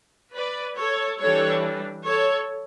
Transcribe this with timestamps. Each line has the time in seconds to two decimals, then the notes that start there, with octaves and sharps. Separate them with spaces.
0.34 B4 D5
0.76 A4 C#5
1.19 E3 G3 D4 A4 C#5
2.04 A4 C#5